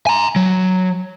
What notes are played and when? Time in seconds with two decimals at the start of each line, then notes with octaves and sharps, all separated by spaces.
0.07 G#5 A#5
0.36 F#3